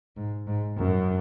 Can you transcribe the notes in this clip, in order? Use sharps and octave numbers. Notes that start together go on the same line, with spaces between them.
G#2
G#2
F#2